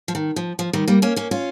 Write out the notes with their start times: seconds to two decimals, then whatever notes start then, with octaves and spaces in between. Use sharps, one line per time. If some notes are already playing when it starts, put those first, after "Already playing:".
0.08 F3
0.15 D#3
0.36 F3
0.59 F3
0.73 D#3 G3
0.88 G3 A#3
1.02 A#3 C#4
1.16 A#3 C#4
1.31 C#4 F4